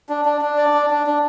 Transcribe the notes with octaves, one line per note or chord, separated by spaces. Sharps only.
D4
D4
D4
D5
D4
D4
D4